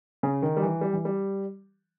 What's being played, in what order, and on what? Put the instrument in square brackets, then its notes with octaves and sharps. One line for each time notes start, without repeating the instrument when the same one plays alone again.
[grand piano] C#3
D#3
G3
E3
G3
E3
G3